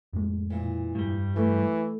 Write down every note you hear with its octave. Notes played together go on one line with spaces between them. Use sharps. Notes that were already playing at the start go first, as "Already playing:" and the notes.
F2 A2 G#3
A#2 E3
G2 G3
E3 A3